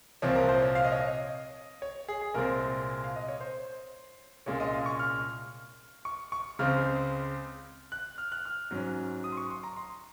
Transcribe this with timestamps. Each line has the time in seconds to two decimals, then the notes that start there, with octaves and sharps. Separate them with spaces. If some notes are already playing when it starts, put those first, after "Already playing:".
0.22 C2 A#2 F3 C4 C#5
0.35 A#4
0.49 C5
0.62 C#5
0.75 F5
0.84 D#5
0.92 C#5
1.01 D#5
1.82 C#5
2.08 G#4
2.21 G#4
2.34 C2 A#2 G#3 C4 A#4
3.04 F5
3.16 D#5
3.28 C#5
3.41 C5
4.46 C2 A#2 G#3 C#4 C#5
4.60 D#5
4.74 F5
4.86 C#6
4.99 F6
6.05 C#6
6.32 C#6
6.59 C#2 C#3 G#3 C4 F6
7.92 F#6
8.18 F6
8.32 F#6
8.45 F6
8.71 G#2 F#3 C#4
9.24 D#6
9.32 C6
9.37 C#6
9.50 C6
9.64 A#5
9.76 C6